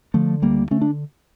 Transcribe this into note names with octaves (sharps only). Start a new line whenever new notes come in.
D3 F3 A3
D2 G3 A#3
D3 A3 C#4
D4